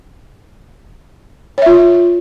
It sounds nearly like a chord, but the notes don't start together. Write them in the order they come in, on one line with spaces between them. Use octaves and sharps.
C#5 E5 F4